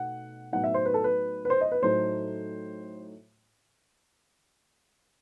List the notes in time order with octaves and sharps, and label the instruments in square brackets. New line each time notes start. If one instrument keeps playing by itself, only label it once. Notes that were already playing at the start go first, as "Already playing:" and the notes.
Already playing: [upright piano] B2 A3 D#4 F#5
A2 F#3 B3 D#4 F#5
E5
C5
B4
A4
B4
B4
C5
D#5
B4
A2 F#3 A3 D#4 C5